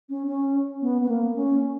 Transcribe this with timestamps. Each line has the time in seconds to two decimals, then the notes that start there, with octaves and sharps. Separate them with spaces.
0.09 C#4
0.27 C#4
0.82 B3
1.02 B3
1.09 A#3
1.36 C#4